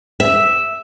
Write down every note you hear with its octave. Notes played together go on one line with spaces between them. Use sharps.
E5